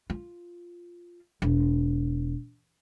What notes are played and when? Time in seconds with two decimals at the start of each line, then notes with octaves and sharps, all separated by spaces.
0.10 F4
1.42 E1